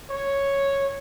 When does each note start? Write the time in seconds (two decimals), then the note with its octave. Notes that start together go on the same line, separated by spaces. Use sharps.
0.10 C#5